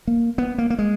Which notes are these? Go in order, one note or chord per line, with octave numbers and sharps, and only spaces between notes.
A#3
B3
A#3
A#3
G#3